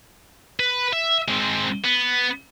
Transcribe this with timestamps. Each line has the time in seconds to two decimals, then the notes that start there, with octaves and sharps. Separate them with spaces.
0.60 B4
0.93 E5
1.28 G#3 C4
1.84 B3